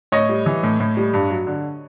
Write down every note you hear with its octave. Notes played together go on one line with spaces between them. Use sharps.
A2 C#5 D#5
G3
E3
A2
A2
G3
G2
F#3
D3